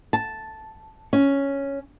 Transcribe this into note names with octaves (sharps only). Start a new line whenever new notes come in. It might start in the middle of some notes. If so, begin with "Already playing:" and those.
A5
C#4